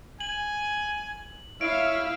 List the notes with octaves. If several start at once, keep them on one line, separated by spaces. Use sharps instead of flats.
G#5 F#7
E4 C#5 E5 F5 D7